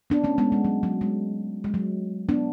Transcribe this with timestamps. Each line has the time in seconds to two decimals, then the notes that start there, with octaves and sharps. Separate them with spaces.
0.10 B3 D4
0.24 A3 C#4
0.38 G#3 B3
0.52 G#3
0.65 F#3
0.83 F#3
1.01 G#3
1.64 G#3
1.74 F#3
2.29 B3 D4